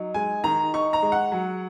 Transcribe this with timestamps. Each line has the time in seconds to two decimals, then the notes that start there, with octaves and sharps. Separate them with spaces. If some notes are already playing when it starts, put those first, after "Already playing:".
Already playing: F#3 D#4
0.14 G#3 G#5
0.44 D#3 A#5
0.74 D#4 C#6
0.93 A#5
1.02 G#3
1.12 F#5
1.32 F#3